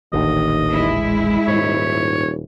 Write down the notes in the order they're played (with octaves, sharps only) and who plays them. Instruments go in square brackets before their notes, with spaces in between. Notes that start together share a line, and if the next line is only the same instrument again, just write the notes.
[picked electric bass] D#1 A1 D3 [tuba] D#2 [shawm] D#5
[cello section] G#3 E4
[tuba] D#1 [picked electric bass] G#2 [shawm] C#5